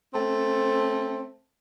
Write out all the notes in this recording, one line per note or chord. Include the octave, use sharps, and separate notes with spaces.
A3 C4 C#4